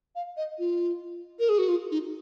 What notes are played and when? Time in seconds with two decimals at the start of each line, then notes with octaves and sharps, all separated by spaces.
0.15 F5
0.37 D#5
0.59 F4
1.39 A#4
1.49 G#4
1.58 F#4
1.68 F4
1.91 D#4